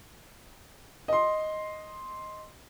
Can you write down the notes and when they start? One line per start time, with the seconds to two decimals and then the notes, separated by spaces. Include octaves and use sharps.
1.08 D#5 C6